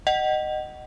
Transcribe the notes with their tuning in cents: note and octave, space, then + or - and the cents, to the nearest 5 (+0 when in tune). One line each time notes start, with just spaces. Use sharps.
D#5 -15 F#5 +30